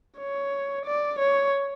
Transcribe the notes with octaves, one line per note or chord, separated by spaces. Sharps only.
C#5
D5
C#5